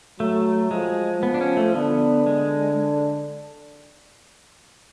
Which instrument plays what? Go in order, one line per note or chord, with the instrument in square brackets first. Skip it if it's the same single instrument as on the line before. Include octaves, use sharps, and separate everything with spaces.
[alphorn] F#3 [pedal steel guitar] A3
[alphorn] F3 [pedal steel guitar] G#3
[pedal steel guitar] B3
D4
C#4
A3
[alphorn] D3 [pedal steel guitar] B3
[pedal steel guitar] G#3